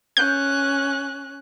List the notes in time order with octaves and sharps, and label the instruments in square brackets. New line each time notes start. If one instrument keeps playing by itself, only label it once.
[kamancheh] C#4 F#6 [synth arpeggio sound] G6